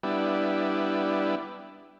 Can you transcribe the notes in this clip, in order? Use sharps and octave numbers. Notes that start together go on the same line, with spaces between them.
G3 B3 D4 E4